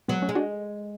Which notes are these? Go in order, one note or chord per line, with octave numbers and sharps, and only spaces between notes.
F#3 G#3 B3
A3 C#4
G#3
D4 F#4